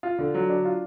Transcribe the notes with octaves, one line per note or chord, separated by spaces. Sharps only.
F4
D3
F#3
D4
F4